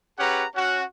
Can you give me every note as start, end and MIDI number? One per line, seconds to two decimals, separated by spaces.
0.19 0.45 61
0.19 0.45 67
0.19 0.45 68
0.19 0.45 71
0.19 0.45 78
0.19 0.45 82
0.55 0.82 61
0.55 0.82 66